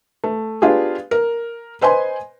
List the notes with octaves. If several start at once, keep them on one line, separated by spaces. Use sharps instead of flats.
A3
B3 D4 F4 G4 G#4
A#4
B4 C5 D#5 G#5 C6